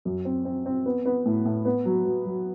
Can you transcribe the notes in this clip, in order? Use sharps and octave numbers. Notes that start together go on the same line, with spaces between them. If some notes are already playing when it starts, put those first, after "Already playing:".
F#2
C4
C4
C4
B3
B3
A2
A2
B3
F#3
F#3
F#3